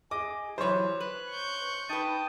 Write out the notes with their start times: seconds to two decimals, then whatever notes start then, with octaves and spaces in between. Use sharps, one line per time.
0.11 G#4 D#5 D6
0.58 E3 F#3 G3 C5 C#5
1.00 B4 F#6
1.31 C#6 G6
1.89 D#4 B4 G5 A5 D#6